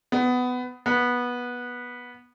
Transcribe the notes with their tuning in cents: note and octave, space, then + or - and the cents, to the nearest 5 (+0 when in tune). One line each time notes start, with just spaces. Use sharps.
B3 +15
B3 -15